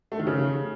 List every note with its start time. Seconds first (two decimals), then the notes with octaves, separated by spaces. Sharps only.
0.12 A3
0.19 D#3
0.27 C#3